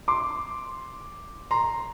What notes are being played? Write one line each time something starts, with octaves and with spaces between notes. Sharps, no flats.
C6 D6
A#5 C6